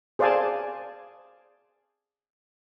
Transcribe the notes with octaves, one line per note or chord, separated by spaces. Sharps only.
G#4 C5 D5 F5 G#5 A5